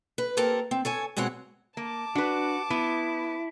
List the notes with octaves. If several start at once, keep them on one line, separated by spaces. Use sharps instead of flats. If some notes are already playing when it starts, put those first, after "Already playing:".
B4
A#3 C4 G4 A4 A#4
C4
A4 C#5 G#5
B2 G#3 C4 C#5 F#5
A#3 A5 D6
D4 F#4 B4
B3 E4